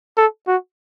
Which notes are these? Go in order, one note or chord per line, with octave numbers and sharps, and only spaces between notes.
A4
F#4